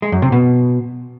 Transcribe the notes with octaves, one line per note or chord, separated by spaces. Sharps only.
G#3
F#2
C3
B2